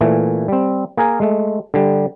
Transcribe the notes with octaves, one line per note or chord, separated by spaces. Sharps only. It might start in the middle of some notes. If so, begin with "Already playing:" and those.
A#2 E3 A3
G3 C4
A#3 G#4 A#4 G#5
G#3 A3
D3 G3